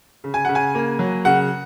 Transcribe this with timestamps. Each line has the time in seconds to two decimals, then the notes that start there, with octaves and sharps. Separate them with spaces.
0.24 C#3
0.34 G#5
0.45 C#3 F#5
0.55 G#5
0.75 A#3
0.99 F#3
1.25 C#3 F#5